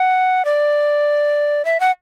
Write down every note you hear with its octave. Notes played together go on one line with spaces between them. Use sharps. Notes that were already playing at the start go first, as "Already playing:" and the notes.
Already playing: F#5
D5
E5
F#5